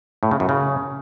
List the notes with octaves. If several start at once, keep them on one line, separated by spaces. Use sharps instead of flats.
A2
C#3
F#2
C#3